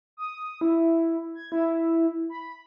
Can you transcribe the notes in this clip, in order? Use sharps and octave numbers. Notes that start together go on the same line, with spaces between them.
D#6
E4
G#6
E4
B5